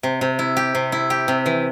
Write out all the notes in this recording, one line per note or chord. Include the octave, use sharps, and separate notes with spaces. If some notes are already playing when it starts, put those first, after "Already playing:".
C3
C3
E4
G4
C3
E4
G4
C3
E3